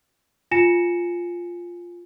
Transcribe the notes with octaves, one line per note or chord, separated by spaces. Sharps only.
F4 G#5 A#6 C#7 E7